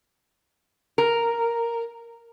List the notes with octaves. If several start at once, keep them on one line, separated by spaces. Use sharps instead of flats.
A#4